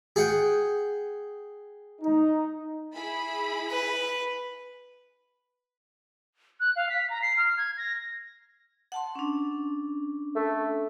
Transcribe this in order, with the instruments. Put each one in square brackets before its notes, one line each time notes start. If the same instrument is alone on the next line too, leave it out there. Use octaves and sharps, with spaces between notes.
[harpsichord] G#4 F#5 G5
[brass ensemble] D#4
[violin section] E4 G#4 B5
[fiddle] B4
[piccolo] F#6
F5
B6
A#5
C7
F6
G#6
A#6
[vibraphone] F#5 A5 C6
C#4 D4
[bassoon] A3